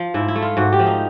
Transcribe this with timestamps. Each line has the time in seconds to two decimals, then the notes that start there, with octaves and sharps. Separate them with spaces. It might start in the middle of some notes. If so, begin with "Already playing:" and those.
Already playing: F3
0.14 G#2 E4
0.28 E4
0.36 A3
0.42 F4
0.57 G#2 F#4
0.73 G4
0.79 F3
0.86 D#4